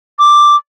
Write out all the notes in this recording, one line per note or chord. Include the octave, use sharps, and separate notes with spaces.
D6